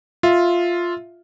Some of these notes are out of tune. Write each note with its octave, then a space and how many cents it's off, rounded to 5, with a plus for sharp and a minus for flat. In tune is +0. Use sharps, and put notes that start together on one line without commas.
F4 +0 E5 +0